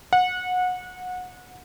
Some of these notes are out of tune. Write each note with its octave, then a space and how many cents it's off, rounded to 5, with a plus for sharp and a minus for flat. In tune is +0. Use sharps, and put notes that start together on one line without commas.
F#5 -25